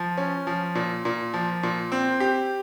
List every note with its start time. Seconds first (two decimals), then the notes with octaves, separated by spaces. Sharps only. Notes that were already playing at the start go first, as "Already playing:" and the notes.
Already playing: F3
0.17 C#4
0.47 F3
0.75 A#2
1.05 A#2
1.34 F3
1.63 A#2
1.92 C4
2.20 G4